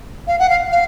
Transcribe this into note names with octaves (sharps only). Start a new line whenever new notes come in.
F5
F#5
F5
F5